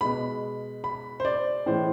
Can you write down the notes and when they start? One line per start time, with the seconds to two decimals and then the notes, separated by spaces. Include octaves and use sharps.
0.01 B2 G#3 B5
0.84 B5
1.20 C5
1.25 D5
1.66 A2 E3 G#3 C5